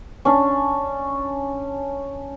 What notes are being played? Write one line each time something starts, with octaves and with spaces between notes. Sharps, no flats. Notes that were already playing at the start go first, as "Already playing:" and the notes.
C#4 D4